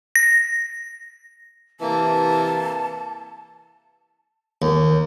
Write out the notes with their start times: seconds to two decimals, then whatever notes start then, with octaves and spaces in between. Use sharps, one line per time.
0.15 A#6
1.80 C3 E3 A#3 A5
4.62 D#2